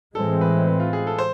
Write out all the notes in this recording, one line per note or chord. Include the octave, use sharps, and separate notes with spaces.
A2 E3 G#3 C4 A4
B4
B4
F4
G#4
A4
C5